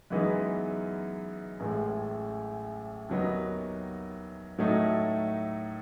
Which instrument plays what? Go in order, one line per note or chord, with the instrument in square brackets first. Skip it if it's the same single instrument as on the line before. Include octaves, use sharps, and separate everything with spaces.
[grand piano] F#2 E3 G#3 B3 D#4
A1 A2 G#3
D#2 D#3 F#3 B3 D#4
A2 F#3 A3 D#4